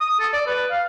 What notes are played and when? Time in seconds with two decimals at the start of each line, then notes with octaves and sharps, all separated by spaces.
0.01 D#6
0.20 A4
0.33 D5
0.47 B4
0.71 F5